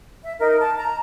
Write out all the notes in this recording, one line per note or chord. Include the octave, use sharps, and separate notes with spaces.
E5
D#4 A#4
A5
A#5